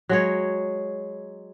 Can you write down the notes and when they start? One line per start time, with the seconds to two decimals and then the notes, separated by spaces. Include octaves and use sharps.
0.09 F#3 G#3 C#5